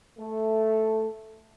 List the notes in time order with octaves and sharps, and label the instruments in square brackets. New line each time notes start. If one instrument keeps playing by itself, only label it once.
[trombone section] A3